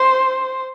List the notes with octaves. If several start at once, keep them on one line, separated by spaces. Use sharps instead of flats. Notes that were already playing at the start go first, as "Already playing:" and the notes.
Already playing: C5